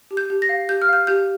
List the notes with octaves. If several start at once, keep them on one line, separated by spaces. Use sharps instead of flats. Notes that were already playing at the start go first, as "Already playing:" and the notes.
G4
G6
G4
A#6
F5
G4 G6
F6
F5 G6
G4 G6